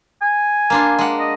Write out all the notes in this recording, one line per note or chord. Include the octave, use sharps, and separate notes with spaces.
G#5
A#3 D4 F4
G#3 F#5
D#5